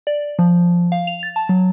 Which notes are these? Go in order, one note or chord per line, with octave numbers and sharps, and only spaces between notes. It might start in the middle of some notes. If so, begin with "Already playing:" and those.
D5
F3
F5
F7
A6
A5
F#3